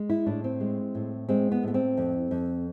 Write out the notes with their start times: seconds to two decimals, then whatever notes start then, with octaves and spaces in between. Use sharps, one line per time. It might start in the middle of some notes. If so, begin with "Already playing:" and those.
Already playing: G#3
0.09 E4
0.26 A2 D4
0.44 C4
0.60 G#3
0.95 A2
1.29 G#3 C4
1.52 B3
1.63 A2 B3
1.74 C4
1.97 F2
2.31 F2